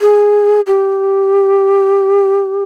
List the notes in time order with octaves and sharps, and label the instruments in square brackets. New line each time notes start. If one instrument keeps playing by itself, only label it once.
[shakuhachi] G#4
G4